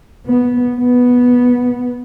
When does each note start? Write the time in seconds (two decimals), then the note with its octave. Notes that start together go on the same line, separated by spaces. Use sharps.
0.26 B3
0.76 B3